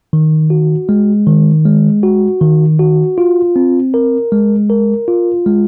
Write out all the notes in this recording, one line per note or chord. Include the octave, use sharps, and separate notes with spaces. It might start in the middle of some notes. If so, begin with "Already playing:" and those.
D#3
F#4
G#3
D#3
G#3
F#4
D#3
F#4
F4
C4
A#4
G#3
A#4
F4
G#3